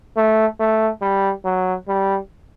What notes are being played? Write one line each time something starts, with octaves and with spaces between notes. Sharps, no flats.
A3
A3
G3
F#3
G3